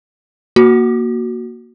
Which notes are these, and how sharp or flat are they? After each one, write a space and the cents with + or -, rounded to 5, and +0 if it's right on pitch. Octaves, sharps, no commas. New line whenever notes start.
A#3 +10 F#4 +0